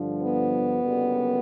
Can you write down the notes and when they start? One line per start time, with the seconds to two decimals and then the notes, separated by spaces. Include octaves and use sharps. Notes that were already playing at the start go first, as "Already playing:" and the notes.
Already playing: G2 D3 F3
0.24 B3
0.81 F#1 F#2 D3 G3